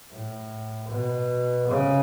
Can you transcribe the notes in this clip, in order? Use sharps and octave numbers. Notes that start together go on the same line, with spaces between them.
A2
B2
C#3